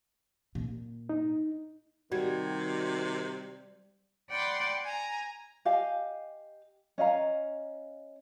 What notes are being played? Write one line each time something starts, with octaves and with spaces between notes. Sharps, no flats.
A#2
D#4
C3 D#3 G3 F#4 G#6
D5 F#5 G5 B5 C6 D6
G#5 A#5
G4 D#5 F5 G#5
C#4 D#5 F5 A#5